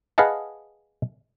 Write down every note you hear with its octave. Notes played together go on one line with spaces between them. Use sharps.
G#4 B4 D#5 F5 F#5 A5